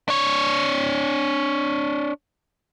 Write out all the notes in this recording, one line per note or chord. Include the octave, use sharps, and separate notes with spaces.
D4 C#5